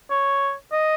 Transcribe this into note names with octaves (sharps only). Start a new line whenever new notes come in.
C#5
D#5